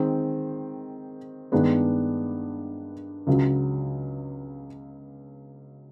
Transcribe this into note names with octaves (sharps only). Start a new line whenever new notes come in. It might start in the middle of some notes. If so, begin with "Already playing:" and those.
Already playing: D#3 G#3 C4
G2 D#3 G#3 B3 D4
C#2 C#3 F#3